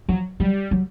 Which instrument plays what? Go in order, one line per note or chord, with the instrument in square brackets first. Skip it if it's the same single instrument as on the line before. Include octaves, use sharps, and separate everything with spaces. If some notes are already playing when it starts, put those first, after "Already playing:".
[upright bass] F3 [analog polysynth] F#3
[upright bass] F#3 [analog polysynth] G3
[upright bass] F#3